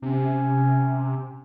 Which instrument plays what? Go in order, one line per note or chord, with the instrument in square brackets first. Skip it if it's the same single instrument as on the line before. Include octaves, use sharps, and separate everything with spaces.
[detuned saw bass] C3 [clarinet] C#4